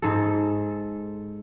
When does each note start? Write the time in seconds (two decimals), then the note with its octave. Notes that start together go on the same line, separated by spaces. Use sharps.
0.02 G#2 A4